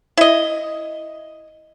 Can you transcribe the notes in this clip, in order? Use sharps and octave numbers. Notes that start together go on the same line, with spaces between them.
E4 D#5